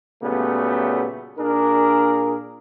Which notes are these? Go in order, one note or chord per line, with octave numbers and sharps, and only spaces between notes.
A#2 C#3 F#3 G3 A3 B3
A#2 D4 G#4 A#4